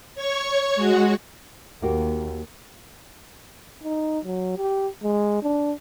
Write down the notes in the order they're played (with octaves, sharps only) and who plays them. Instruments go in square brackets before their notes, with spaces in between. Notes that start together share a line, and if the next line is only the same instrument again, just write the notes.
[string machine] C#5 C#6
G#3 F#4
[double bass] D#2 [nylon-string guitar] A#3 F#4 G4
[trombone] D#4
F#3
G4
G#3
D4